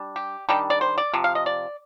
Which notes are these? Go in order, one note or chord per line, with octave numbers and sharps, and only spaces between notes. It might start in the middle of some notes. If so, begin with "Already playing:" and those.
Already playing: G3 D4
G4
D#3 G3 D4 G4
D5
C5
D5
C3 F3
F5
D#5
D5